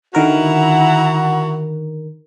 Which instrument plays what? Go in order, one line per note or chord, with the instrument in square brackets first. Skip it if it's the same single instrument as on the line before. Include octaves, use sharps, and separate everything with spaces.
[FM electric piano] D3 D#3 A#4 [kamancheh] E4 A#5 [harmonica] F#4 [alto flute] F#5